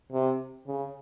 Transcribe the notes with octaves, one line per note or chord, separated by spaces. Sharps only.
C3
C#3